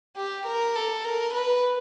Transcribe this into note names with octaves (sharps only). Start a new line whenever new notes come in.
G4
A#4
A4
A#4
B4